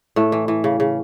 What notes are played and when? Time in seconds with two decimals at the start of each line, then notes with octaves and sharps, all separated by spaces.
0.16 A2 A3
0.32 E3
0.48 E3
0.64 C#3
0.80 C#3